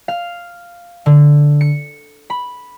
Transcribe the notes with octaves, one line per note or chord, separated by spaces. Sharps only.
F5
D3
C#7
B5